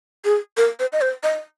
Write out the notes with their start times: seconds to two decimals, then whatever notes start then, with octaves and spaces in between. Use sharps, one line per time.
0.25 G#4
0.57 A#4
0.80 C5
0.93 D#5
1.01 C5
1.23 D#5